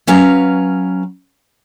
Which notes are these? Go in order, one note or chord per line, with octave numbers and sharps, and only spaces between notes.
F#3 C#4 B4 F5 A#5